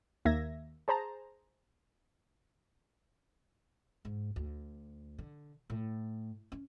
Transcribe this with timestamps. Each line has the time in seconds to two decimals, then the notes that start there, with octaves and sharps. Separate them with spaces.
0.25 D#2 A#3 E5 G#6 A#6
0.88 G#4 C5 A5 A#5
4.05 G#2
4.36 D2
5.19 D3
5.70 A2
6.52 C#4